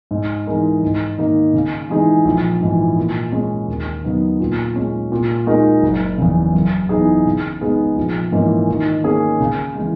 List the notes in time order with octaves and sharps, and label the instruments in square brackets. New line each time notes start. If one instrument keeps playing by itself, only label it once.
[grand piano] G#2
E3 G#3 D#4 A#4
G#2
D#3 A#3 D#4
C#3
E3 G#3 D#4 G#4
A#1
G#2 E3
A#2
G#3 C#4
D#2
C#3 F#3 B3 D#4
A#2
G#3 C#4
A#2
G#3 D#4 F#4 A#4
F#1
E2 C#3
F#2
E3 B3 D#4 G#4
C#3
G#3 B3 D#4 G#4
A#1
G#2 E3 A#3 C#4
D#3
A#3 C#4 G#4
C#3
E3 G#3